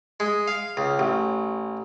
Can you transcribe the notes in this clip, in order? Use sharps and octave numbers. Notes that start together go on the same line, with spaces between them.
G#3
F5
C#2
A1